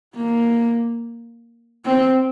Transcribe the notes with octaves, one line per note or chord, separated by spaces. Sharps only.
A#3
C4